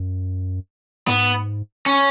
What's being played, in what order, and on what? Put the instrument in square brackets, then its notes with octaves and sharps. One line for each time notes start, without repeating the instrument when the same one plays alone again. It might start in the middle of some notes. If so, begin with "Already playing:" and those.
Already playing: [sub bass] F#2
[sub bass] G#2 [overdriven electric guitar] B3
[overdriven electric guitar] C#4